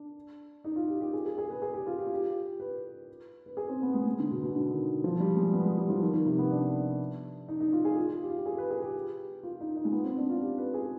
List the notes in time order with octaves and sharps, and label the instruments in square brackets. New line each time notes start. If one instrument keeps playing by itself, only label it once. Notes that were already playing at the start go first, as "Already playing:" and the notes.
Already playing: [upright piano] D4
D#4
F4
G4
G4
G#4
G#4
G#4
B4
G#4
G4
F4
G4
F4
G4
B4
B4
G#4
C4
B3
G#3
G#3
D3
B2
B2
D3
D#3
F3
G3
G#3
B3
G#3
G3
F3
D#3
D#3
C3
B3
D4
D#4
D#4
F4
G#4
F4
G4
F4
G4
G#4
B4
G#4
G4
F4
D#4
D#4
G#3
B3
C4
D4
F4
G4
B4
G#4